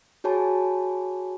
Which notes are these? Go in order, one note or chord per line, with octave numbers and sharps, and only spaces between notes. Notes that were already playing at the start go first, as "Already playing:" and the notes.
F#4 G#4 C#5 G#5 A5 B5